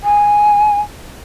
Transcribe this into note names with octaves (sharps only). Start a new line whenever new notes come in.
G#5